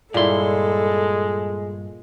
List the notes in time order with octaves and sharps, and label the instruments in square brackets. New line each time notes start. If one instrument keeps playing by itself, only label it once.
[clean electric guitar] G2 C6 [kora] A#2 E4 [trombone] G#3 [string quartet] A4